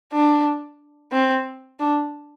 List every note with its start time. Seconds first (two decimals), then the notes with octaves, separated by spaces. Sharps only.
0.13 D4
1.12 C4
1.79 D4